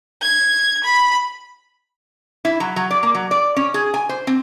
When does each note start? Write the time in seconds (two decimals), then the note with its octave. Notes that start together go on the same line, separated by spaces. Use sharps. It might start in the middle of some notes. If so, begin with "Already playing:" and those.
0.22 G#6
0.84 B5
2.45 E4
2.60 F#3
2.76 F#3
2.91 D5
3.03 A#3
3.15 F#3
3.31 D5
3.56 C#4
3.74 G#4
3.94 G#5
4.09 C5
4.27 C4